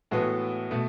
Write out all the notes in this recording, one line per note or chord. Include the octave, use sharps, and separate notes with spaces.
A2 E3 G#3 B3 F#4 A4
B2 A3